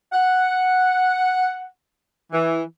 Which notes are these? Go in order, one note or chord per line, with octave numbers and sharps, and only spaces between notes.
F#5
E3